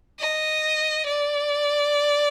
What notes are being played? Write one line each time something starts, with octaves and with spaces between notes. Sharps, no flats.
D#5
D5